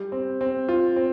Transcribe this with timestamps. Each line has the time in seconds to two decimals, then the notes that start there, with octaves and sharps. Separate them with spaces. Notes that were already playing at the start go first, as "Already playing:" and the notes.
Already playing: G3
0.12 C4
0.41 C4
0.69 F4
0.96 C4